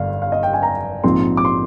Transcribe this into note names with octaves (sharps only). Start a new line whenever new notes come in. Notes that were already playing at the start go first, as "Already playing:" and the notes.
Already playing: G1 G2 D3 F5
F5
D#5
G5
G#5
A#5
A#1 G#2 F3 C4 C6
D6
C6